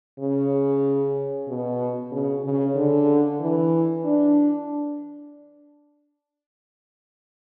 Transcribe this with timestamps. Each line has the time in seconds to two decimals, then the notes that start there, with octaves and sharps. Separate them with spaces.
0.19 C#3
1.48 B2
2.11 C#3
2.44 C#3
2.75 D3
3.40 E3
4.04 D4